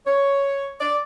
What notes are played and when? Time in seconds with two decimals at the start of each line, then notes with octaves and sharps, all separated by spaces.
0.06 C#5
0.80 D5